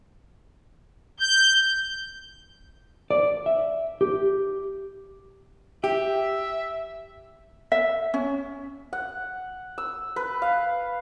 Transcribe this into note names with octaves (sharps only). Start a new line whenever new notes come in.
G6
D5
E5
G4
G4 E5
E5
C#4
F#5
E6
B4
F5